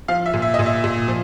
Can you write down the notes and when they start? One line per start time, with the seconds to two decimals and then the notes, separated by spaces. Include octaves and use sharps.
0.08 F3 F5
0.26 E5
0.34 A#2
0.42 E5
0.54 A#2 D#5
0.66 E5
0.84 A#2
1.08 F3